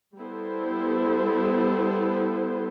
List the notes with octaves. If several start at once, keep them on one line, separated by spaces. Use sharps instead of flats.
G3 B3 E4 A4 C5